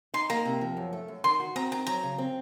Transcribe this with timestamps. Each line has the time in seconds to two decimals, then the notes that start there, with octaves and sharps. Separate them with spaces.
0.14 D#4 C6
0.30 A#3 A#5
0.45 C3
0.61 F3
0.77 F#2
0.93 A3
1.08 F#2
1.24 D#3 C6
1.40 F#4
1.56 C4 A#5
1.71 D#3 A#5
1.87 F#3 A#5
2.03 C#3
2.18 C4